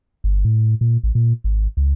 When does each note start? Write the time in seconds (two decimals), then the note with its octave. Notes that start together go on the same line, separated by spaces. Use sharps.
0.24 G1
0.45 A2
0.81 A#2
1.03 A1
1.15 A#2
1.44 G#1
1.77 C#2